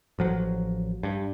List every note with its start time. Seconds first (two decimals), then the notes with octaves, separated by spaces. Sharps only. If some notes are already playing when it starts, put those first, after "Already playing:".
0.19 A1 F3 F#3
1.03 G2